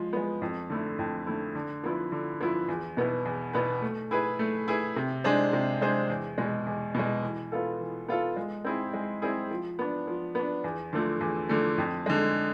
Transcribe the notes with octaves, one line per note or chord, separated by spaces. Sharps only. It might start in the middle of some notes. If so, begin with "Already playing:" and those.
Already playing: F3 G#3
G#3 B3
F2
D3 A3 E4
F2
D3 A3 E4
D3
F3 B3 E4 B4
D3
F3 B3 E4 B4
E2
B2 B3 E4 B4
E2
B2 B3 E4 B4
A3
E4 G#4 B4
A3
E4 G#4 B4
C3
G#3 D4 G#4 C5
C3
G#3 D4 G#4 C5
E2
B2 G#3
E2
B2 G#3
E3
B3 F4 A4
E3
B3 F4 A4
G#3
C4 E4 G#4
G#3
C4 E4 G#4
F3
B3 D4
F3
B3 D4
E2
D3 F3 A3
E2
D3 F3 A3
F2
D3 G#3